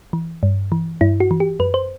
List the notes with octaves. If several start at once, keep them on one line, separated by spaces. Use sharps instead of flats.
E3
G2
E3
G2 E4
F#4
E3
G4
F#2 B4
C5